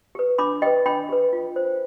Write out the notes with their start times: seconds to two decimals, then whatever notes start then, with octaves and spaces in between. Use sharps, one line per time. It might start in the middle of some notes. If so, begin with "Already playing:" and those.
0.15 G4 B4
0.38 D4 B5 D6
0.62 G4 B4 D#5 G5
0.86 D4 G5 B5
1.09 G4 B4
1.33 F4
1.56 C5